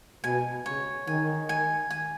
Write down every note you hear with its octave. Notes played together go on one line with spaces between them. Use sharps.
B2 G#5
C#3 C#5
D#3 G#5
G#5
G#5